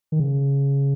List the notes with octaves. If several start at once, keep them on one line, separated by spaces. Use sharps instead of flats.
D#3
C#3